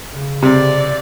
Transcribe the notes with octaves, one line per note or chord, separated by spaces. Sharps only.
C#3
C3 D5